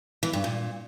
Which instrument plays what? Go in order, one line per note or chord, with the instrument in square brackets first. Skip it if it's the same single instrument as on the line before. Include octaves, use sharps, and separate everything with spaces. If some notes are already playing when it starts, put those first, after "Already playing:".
[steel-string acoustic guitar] E3
G2
A#2